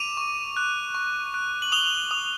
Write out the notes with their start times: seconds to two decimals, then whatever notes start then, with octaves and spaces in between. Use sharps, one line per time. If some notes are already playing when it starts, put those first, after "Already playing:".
Already playing: D6 D#7 F7
0.17 C#6
0.57 F#6
0.94 C#6
1.34 F#6
1.62 F#7
1.72 D#6 F7 G7
2.11 D#6